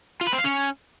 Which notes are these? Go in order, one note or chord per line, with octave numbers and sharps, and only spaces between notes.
F4
B4
C4
F5
C#4